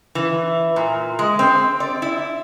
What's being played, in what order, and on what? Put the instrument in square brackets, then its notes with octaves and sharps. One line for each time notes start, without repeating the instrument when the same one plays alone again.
[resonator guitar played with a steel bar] E3
A#2
G#3
C4
D5
E4